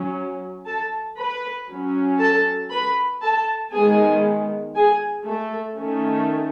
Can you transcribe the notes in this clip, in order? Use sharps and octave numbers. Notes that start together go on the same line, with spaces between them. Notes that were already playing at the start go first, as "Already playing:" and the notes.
Already playing: F#3 C#4
A4 A5
B4 B5
F#3 C#4
A4 A5
B4 B5
A4 A5
D#3 G#3 B3 G#4 G#5
G#4 G#5
A3 A4
D#3 A3 C#4